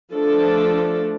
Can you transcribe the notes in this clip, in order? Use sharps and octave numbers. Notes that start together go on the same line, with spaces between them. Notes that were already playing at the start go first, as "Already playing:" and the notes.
F3 A3 D4 A4